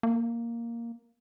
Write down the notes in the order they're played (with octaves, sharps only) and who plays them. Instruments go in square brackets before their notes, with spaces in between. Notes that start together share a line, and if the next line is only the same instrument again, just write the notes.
[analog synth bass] A#3